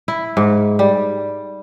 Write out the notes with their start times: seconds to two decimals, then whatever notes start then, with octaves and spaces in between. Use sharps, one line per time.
0.08 E4
0.37 G#2
0.79 G3